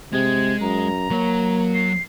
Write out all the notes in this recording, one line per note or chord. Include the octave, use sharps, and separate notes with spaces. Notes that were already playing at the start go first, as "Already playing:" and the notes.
C3 G#3 G#6
F#2 A#5
F#3 A#3 C#5
C7